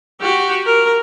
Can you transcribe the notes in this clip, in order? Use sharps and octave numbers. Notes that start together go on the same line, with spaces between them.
F#4 G4
A#4